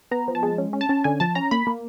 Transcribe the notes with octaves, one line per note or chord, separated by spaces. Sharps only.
B3 A#5
F3
A5
G#3
C#4
C#4
A5
C#4
D3 G#5
F3 A5
C#4 A#5
A#3 B5
A#3